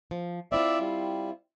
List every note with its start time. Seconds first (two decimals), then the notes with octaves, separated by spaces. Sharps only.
0.11 F3
0.52 C4 E4 F4 D5 E5
0.80 G3